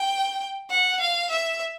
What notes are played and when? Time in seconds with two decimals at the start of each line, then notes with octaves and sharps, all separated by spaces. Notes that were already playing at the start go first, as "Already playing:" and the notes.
Already playing: G5
0.70 F#5
1.00 F5
1.30 E5